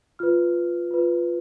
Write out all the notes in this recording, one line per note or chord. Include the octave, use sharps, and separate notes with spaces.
F4 B4 F6
F4 B4